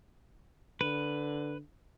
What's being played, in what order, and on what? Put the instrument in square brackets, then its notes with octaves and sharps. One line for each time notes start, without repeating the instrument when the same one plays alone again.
[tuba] D3 [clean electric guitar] B4